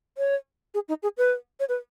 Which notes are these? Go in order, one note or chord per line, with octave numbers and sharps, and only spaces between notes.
C#5
G#4
D#4
G#4
B4
C#5
B4